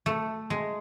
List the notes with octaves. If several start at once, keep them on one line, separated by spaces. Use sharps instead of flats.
A3
G#3